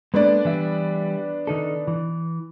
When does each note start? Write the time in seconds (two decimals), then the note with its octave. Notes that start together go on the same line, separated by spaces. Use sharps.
0.14 G#3 A#3 B3 D4 A4 D5
0.45 E3 G3 E5
1.47 D#3 D#4 A4
1.88 E3